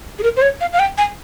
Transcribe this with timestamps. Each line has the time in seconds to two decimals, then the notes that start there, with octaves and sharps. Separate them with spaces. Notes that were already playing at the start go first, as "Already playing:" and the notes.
0.19 G#4
0.23 A#4
0.37 C5
0.42 C#5
0.61 F5
0.73 F5
0.79 G5
0.98 G#5